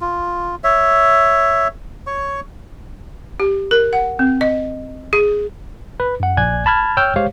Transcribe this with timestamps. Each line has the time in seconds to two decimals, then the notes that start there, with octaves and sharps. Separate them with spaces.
0.01 F4
0.64 C#5 E5
2.07 C#5 C#6
3.40 G4
3.71 A#4
3.93 F#5
4.19 C4
4.41 D#5
5.13 G#4
6.00 B4
6.20 F#2 F#5
6.37 A#1 D5 G#5 F#6 G#6
6.66 A5 B5 F6 G#6
6.97 C#5 G5 E6 F6 G6
7.16 G#3 G4 C5 C#5 F5